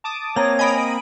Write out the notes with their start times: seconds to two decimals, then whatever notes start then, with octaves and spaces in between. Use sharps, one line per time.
0.04 A5 D6 D#6
0.36 A#3 C4 C#5 A#5
0.59 D#5 G#5 A#5 B5 D#6 D7